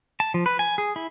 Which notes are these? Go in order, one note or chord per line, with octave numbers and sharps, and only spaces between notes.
A5
F3
B4
G#5
G#4
E4